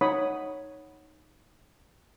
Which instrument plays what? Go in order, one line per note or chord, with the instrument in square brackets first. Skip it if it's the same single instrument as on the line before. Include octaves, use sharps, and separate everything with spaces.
[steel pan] D#4 C#5 F#5 B5 D#6